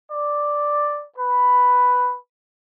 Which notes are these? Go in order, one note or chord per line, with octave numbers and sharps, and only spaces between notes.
D5
B4